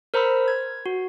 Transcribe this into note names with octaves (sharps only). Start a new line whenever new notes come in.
A#4 C5 A#5 B5 E6
G#6
F#4